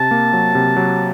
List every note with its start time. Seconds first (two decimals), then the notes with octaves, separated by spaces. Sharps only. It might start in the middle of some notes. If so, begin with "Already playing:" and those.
Already playing: C3 A5
0.11 A#3
0.33 F#3
0.55 C3
0.76 F#3